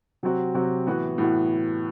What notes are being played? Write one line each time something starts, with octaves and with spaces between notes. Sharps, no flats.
C3 F#3 C4 F#4
C3 F#3 C4 F#4
A2 E3 B3 F#4
A2 E3 B3 F#4